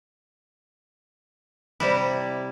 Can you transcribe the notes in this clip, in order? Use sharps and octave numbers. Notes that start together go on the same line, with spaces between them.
C3 G3 E4